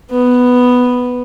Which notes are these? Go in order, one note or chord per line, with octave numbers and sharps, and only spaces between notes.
B3